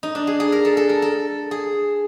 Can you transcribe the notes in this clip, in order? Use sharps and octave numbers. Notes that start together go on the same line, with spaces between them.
D#4
D4
G#4
G#4
A#4
A4
A4
A#4
A4
G#4